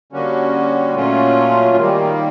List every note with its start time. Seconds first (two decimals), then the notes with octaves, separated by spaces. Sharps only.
0.12 D3 G3 A#3 C#4 F#4
0.94 A#2 F#3 A3 C#4 F4
1.76 D#3 G3 A#3